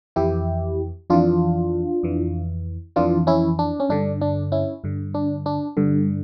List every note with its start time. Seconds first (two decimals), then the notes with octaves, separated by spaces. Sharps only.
0.16 F2 E3 E4 G4
1.10 F2 E3 D4 F4
2.03 F2 E3
2.96 F2 E3 D4 F4
3.27 C#4 E4
3.59 D4
3.80 C#4
3.89 G2 D3 D4
4.21 D4
4.52 C#4 E4
4.84 G2 D3
5.14 D4
5.46 D4
5.77 G2 D3